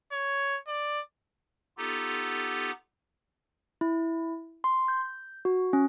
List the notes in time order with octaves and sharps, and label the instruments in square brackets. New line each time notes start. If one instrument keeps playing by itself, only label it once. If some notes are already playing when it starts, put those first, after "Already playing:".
[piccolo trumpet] C#5
D5
[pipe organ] B3 D#4 F4 G4 A4
[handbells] E4
C6
G6
F#4
C#4